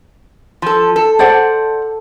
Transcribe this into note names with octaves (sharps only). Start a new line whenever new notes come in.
F3 A4
A4
C5 D5 F#5